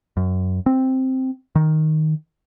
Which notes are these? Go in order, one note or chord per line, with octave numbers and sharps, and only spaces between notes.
F#2
C4
D#3